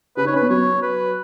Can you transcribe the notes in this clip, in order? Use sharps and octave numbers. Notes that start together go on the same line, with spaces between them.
C#3 B4
D#4 C#5
C#4
B4
B3
F#3 C#5
B4